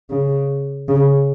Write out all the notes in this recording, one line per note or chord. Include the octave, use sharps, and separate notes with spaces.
C#3
C#3